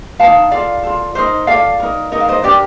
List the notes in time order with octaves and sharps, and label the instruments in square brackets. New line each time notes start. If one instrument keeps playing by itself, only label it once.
[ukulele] D#4 A#4 F5 A5
F4 A4 D5 F5
F4 A4
D#4 G4 A#4 C5 D#5
F4 A4 D5 F5
D#4 A#4
D#4 A#4 D#5
F5
C5 D#5
D4 G4 A#4 D5